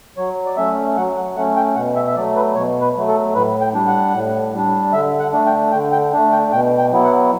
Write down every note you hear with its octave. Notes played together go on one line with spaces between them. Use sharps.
F#3 C#5
D5
A3 C#4 E5
F#3 F#5
F#5
A3 C#4 F#5
G5
B2 F#5
E5
E5
F#3 A3 D5
B4
B2 C#5
B4
F#3 A3
A4
A2 B4
G5
G3 D4
F#5
A2
G3 D4
D3 E5
F#5
A3 D4
G5
D3 G5
G5
A3 D4
G5
B2 G5
G5
F#3 B3 E4
F#5